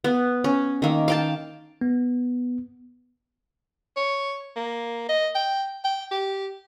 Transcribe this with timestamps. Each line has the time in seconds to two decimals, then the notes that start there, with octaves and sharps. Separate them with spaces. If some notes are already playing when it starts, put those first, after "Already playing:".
0.04 B3
0.44 C#4
0.82 D#3 A#3
1.08 F5 G5 A5
1.81 B3
3.97 C#5
4.56 A#3
5.09 D#5
5.35 G5
5.84 G5
6.11 G4